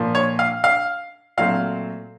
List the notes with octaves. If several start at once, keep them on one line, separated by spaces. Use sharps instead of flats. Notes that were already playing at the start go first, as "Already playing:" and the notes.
Already playing: A#2 F3 A#3
C#5
F5
F5
A#2 F#3 A3 C4 F5